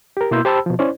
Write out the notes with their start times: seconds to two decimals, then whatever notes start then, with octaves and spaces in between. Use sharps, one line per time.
0.17 G4 A#4
0.31 B2 A#3 E4 C6 E6 G6
0.45 G4 C5 G5 A5 B5 E6
0.66 B2 F3
0.79 C#4 E4 C5 D5